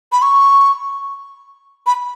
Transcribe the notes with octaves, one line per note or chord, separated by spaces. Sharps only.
B5
C#6
B5